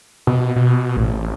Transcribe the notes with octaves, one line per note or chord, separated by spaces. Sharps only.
B2
B2
A1